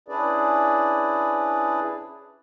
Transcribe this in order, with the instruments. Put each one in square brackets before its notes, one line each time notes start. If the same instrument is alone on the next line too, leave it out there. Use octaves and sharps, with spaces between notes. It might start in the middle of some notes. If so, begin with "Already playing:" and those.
[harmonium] C#4 D4 E4 G#4 B4 D5